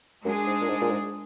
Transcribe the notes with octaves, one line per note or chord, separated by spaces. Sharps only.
F#2 G#3 D4 G#4
G#2
A#2
G#2
A#2
G#2